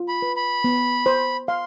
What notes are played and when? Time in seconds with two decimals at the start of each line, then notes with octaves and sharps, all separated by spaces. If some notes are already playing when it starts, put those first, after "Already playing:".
Already playing: F4
0.08 B5
0.22 B4
0.36 B5
0.64 B3
1.06 C5
1.48 F5 C6